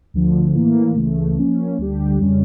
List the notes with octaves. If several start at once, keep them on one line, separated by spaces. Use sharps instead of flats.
D2 D3 F3
A2 E3 A#3
C#2 C#3 E3 A3
F3 A#3 C#4
D2 D3 G3 D4 G4
F2 C#3 G3 C#4